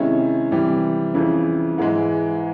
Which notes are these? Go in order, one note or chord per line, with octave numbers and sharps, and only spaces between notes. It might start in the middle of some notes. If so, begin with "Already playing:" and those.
Already playing: C3 D#3 G#3 C#4 E4
C3 E3 G3
F2 C#3 E3
G#2 E3 G#3